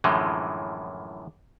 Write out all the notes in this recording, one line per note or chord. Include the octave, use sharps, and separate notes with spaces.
F#2 A2 D3 E3 F3 G#3